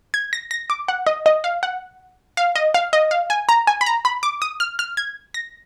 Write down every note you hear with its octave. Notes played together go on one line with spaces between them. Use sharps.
G#6
A#6
A#6
D6
F#5
D#5
D#5
F5
F#5
F5
D#5
F5
D#5
F5
G#5
A#5
G#5
B5
A#5
B5
D6
D#6
F6
F6
G#6
A#6